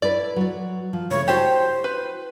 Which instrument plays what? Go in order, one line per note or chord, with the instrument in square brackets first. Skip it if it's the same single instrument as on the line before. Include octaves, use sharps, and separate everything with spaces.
[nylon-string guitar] E4 A4 B4 [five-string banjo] D5
[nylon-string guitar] F#3 F#4
F3
[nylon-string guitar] C#3 A3 [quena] C#5
[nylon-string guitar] E4 F#4 [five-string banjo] G4 A5 [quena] C5
[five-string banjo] B4